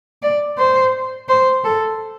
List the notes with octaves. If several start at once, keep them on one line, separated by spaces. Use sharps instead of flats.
D5
C5
C5
A4